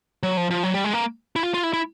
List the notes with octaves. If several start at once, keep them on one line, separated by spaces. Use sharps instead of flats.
F#3
F3
F3
F#3
G3
G#3
A#3
E4
F4
F4
E4
E4